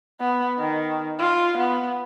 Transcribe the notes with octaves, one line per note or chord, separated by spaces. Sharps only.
B3
D#3
F4
B3